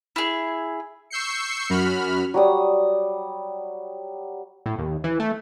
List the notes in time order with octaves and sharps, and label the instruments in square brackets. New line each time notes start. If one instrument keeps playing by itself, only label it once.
[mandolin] E4 G#4
[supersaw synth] C#6 E6 G6 C7 C#7
F#2 F#4 B5 F6
[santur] F#3 G3 D#6
[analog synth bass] A2
D#2
E3
A3